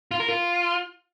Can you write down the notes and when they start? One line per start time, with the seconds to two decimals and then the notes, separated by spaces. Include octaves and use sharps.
0.11 F4
0.20 A#4
0.28 F4